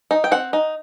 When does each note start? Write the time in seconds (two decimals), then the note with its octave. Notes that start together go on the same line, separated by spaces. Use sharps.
0.11 D#4
0.24 G5
0.31 C4 F#5
0.53 D#4